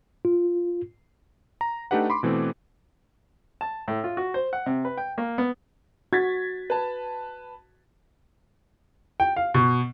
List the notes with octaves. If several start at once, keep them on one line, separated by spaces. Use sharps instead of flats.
F4
A#5
A3 D4 D#4 G4 B4 F#5
B5 C6 D6
B2 E3 A3 C4
A5
A2
F4
F#4
C5
F#5
C3
B4
G5
A#3
B3
F#4 G#6 A6 B6
B4 A5
G5
F5
B2